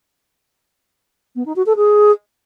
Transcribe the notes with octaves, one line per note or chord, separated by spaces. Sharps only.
B3
D#4
F#4
A4
G#4